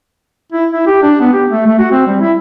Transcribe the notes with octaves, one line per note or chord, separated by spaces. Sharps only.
E4
E4
G4
D4
B3
G4
A3
A3
F#4
C4
G3
E4